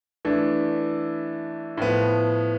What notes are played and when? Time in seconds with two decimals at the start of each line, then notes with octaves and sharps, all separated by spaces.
0.25 E3 A3 D4
1.77 A2 F3 B3